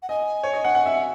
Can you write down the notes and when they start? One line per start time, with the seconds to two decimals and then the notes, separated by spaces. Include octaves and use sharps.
0.02 F#5
0.09 D#5 G#5
0.43 C#5
0.53 D#5
0.64 F#5
0.75 F#5
0.86 E5